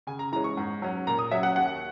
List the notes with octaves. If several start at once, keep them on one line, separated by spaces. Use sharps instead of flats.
C#3 G#5
A#5
E3 G#3 C#4 A#5
C#6
G#2
F#3 C#4
A#2 A#5
D#6
F#3 C#4 E5
F#5
D#2 F#5